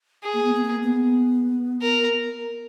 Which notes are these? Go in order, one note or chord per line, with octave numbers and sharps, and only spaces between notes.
G#4
A#3
B3
B3
A#3
B3
A#4